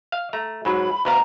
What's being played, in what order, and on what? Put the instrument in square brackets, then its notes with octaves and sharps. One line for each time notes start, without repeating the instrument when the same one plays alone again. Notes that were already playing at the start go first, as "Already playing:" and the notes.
[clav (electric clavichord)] F5
A3 A#5
[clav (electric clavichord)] G#2 F#3 [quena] B5
[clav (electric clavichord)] D2 B3 F5 [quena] A#5